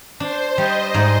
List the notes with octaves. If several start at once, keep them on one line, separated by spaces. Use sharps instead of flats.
D4 C5
G3 D#5
G#2